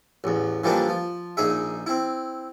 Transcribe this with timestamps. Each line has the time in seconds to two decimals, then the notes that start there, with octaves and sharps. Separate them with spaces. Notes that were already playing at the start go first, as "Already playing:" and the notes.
0.24 A1 E2
0.64 E3 F3 G3 A3 A#3 D4
0.89 F3
1.37 A#1 D#4 G#4 E5
1.86 C4 E4